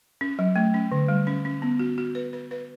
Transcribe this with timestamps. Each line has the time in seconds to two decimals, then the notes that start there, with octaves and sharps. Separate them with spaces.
0.21 C#4
0.39 F#3
0.56 A3
0.74 C#4
0.92 D3
1.08 G3
1.27 C#4
1.45 C#4
1.62 B3
1.79 F#4
1.98 F#4
2.15 B4
2.33 B4
2.51 B4